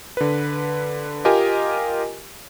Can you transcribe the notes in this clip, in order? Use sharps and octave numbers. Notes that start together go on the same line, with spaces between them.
D3 B4
F4 G4 A#4 D#5 G#5